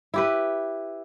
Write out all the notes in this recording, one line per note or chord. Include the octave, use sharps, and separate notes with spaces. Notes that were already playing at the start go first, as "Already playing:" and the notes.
E4 G4 B4